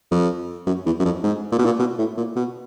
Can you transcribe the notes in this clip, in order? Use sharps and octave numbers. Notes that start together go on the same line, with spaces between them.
F2
F#2
E2
F#2
F2
G#2
A#2
B2
A#2
B2
A2
A#2
B2